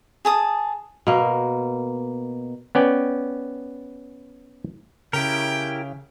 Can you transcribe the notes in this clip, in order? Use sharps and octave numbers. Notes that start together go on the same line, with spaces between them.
G#4 A5 D#6
B2 A#3
B3 C#4 D5 G5
C#3 E4 G4 A#4 G5